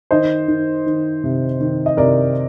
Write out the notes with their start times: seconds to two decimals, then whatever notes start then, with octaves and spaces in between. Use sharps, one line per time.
0.11 D#3 C5 D#5
0.48 D#3
0.86 D#3
1.24 C3
1.60 D#3
1.86 D#5
1.97 C3 A#4 D5